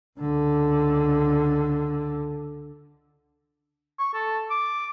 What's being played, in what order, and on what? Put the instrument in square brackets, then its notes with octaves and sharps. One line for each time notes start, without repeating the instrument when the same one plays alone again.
[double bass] C#2 D3
[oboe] C#6
A4
D6